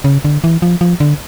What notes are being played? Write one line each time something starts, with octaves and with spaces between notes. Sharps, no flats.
C#3
D3
E3
F3
F3
D3